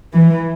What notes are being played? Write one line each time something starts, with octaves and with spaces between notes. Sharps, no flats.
E3